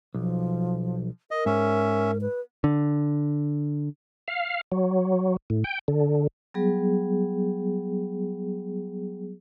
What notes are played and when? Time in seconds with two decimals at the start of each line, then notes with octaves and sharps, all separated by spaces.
0.14 B1 F3
1.31 A#4 D#5
1.46 G#2 C#4 E5
2.21 B4
2.64 D3
4.28 F5
4.72 F#3
5.50 A2
5.64 G5
5.88 D3
6.54 F#3 G3 B3 G#4